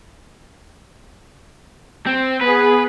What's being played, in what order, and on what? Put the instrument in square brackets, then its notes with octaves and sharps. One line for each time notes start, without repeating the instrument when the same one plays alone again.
[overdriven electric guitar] C4
[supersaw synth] B3 G#4 [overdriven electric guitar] B4